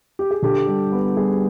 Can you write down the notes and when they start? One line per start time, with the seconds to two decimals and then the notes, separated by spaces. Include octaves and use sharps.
0.19 G4
0.31 G#4
0.42 D3 G4 A4
0.67 G3
0.92 B3
1.16 G3 G#4